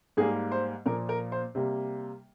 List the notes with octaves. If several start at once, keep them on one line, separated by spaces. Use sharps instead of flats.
G#2 G3 A#3 G#4
C5
A#2 F3 A#3 A#4
A#4
C5
C3 G3 A#3